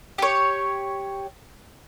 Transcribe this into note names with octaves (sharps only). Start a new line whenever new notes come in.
G4 C#5